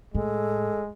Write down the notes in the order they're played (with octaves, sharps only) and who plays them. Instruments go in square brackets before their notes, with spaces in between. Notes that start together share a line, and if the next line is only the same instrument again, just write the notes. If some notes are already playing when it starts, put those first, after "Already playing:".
[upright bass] A2 [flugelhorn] G#3 [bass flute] A4